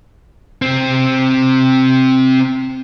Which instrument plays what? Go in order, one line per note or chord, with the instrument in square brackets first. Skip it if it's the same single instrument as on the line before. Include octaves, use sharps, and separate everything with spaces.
[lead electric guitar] C3 C4